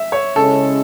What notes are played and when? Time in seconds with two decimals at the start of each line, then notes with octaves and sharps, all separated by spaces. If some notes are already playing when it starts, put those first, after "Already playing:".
Already playing: E5
0.12 C#5
0.36 C#3 G#3 C#4 E4 A4